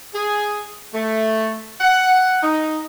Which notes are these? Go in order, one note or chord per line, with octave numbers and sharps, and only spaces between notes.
G#4
A3
F#5
D#4